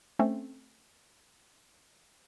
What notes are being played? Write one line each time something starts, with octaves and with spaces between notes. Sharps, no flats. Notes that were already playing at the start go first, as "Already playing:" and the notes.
A3 C4 C#4